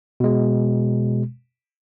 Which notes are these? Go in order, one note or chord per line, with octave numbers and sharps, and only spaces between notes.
B2 G#3